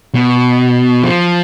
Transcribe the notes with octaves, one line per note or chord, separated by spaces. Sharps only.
B2
F3